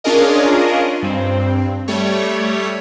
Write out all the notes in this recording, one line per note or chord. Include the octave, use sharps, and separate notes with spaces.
C#4 D4 F4 G#4 A#4 D#5
G2 C4
G3 A3 C#5